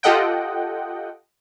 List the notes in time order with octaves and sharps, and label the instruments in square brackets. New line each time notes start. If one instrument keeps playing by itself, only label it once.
[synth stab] F4 G4 A4 D#5 F#5 G5